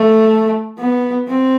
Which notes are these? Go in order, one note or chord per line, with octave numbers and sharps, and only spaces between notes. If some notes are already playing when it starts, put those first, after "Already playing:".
Already playing: A3
B3
C4